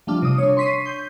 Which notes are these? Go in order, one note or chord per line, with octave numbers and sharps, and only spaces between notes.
F3 G3 A3 D4 F4
C3 D#6
D4 C#5
C6 C#6 B6 C7 D#7
G6